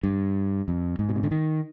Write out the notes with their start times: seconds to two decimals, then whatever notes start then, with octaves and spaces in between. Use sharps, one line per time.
0.04 G2
0.68 F2
0.99 G#2
1.09 B2
1.16 C3
1.23 D3
1.31 D#3